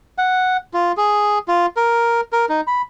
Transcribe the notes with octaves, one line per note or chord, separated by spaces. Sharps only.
F#5
F4
G#4
F4
A#4
A#4
D#4
B5